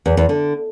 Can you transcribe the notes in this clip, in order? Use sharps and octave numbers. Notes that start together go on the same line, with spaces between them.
E2
E2
D3